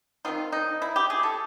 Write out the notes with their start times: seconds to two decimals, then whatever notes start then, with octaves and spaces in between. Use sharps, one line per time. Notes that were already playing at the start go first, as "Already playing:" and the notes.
0.25 D#3 G#3 C4 D#4 F4
0.52 D#4
0.82 E4
0.96 G4
1.10 G#4
1.23 A4